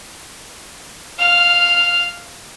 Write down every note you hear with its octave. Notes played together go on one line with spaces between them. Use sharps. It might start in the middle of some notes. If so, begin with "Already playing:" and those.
F5 F6